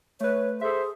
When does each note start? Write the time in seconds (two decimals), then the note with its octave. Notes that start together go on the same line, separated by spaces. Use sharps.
0.20 A3 B4 C#5
0.61 G#4 A4 C5 E5